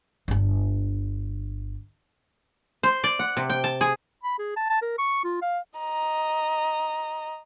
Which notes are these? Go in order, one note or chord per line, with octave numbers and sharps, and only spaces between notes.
G1 D4
C5
D5
F#5
C3
G5
A5
G#4
B5
G#4
A5
A5
A#4
C#6
F4
F5
D#5 A#5